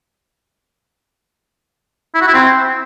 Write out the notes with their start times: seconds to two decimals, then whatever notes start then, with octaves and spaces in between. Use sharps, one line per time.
2.15 E4
2.21 F#4
2.28 E4
2.34 C4